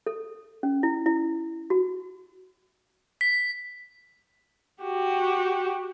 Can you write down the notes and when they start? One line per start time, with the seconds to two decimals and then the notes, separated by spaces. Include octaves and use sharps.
0.06 A4
0.63 C#4
0.83 E4
1.06 E4
1.70 F#4
3.21 B6
4.83 F#4 G4